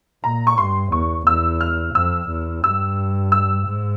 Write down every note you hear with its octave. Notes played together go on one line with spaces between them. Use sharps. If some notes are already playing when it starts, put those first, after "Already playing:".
A#2 A#5
C#6
G2 C6
E2 C#6
E2 E6
F6
F2 E6
E2
G2 E6
E6
G#2